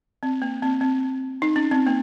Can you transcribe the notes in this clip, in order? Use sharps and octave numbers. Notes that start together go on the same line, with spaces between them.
C4
A#3
C4
C4
D#4
C#4
C4
A#3